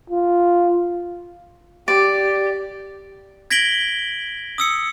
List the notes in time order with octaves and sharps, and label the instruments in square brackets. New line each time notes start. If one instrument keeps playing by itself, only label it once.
[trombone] F4
[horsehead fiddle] G4 [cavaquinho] D5
[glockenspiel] G#6 A#6 B6 D7 F#7 G7
D#6 E6 C#7